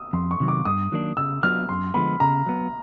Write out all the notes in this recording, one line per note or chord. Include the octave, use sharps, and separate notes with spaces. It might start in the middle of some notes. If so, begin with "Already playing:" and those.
Already playing: D#6 E6
F2 C6
C#6
C3 D#3 F#3
D6
G2 D#6
D#3 F#3 A#3 D4
C#3 E6
F#3 B3 D4 F4 F6
F#2 C6
D3 F3 G#3 B3 B5
C#3 A#5
F#3 B3